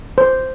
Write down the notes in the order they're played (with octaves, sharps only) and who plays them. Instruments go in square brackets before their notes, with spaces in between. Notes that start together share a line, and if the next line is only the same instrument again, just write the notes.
[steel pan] C5